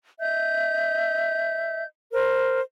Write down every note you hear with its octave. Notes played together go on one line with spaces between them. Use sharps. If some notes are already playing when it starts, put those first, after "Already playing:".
D#5 E5 G6
A#4 C5